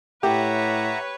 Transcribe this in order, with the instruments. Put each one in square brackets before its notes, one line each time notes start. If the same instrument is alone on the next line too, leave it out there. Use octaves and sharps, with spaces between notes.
[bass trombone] A2 [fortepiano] G4 [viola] B4 C#5 [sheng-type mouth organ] E5 F#5 A#5